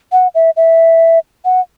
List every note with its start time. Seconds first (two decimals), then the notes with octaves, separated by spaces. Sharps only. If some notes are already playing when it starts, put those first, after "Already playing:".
0.12 F#5
0.35 E5
0.57 E5
1.45 F#5